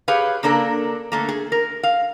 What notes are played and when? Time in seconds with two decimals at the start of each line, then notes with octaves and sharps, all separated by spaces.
0.08 G4 G#4 B4 C#5 F5
0.43 C#3 A#3 D4 A4 A#4
1.12 D3 A3 A#3
1.29 G#4
1.52 A#4
1.83 F5